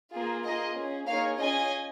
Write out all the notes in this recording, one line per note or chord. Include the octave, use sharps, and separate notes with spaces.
A#3 F4 G#4
A#3 F4 G#4 D#5
C#4 G#4
A#3 D#4 G#4 C#5 F5
C#4 F4 G#4 D#5 G#5